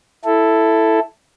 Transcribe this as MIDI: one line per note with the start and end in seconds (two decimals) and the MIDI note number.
0.25 0.99 64
0.25 0.99 69